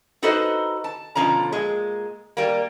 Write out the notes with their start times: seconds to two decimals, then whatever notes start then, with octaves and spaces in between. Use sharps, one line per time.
0.23 D#4 F#4 A4 B4 C5 D#5
0.84 A5
1.15 B2 D3 F3 C#4 A#5
1.52 A#2 G#3
2.37 G3 A#3